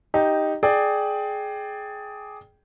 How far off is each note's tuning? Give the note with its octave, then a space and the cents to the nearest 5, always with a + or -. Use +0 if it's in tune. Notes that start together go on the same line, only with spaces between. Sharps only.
D#4 +0 G4 +0
G#4 +15 D5 +15 G5 +0